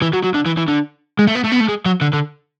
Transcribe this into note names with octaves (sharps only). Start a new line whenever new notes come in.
E3
F#3
F#3
D3
E3
E3
D3
G#3
A3
B3
A3
B3
A3
G#3
F#3
D3
D3